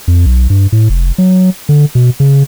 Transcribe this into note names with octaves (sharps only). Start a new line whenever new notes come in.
F2
B1
G2
A2
F1
F#3
D3
B2
C#3